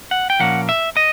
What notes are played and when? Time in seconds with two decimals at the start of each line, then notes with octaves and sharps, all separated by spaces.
0.11 F#5
0.30 G5
0.40 A#2 F3 A#3 C#4 F#5
0.69 E5
0.97 D#5